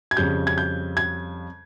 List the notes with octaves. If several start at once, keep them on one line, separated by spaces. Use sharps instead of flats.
G#6
F2 C#3 G3 G6
G#6
G6
G#6